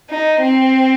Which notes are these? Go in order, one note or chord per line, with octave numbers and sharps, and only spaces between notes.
D#4
C4